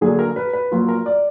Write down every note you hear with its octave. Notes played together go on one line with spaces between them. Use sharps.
D3 F#3 A#3 D4 G#4
A#4
B4
B4
F#3 A#3 F4
A#4
D5